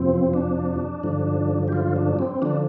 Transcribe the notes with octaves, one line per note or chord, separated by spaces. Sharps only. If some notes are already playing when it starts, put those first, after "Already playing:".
Already playing: F2 C3 F3 C4
D4
G2 D3 F3
G4
F4
D4
C4
D3 F3 D4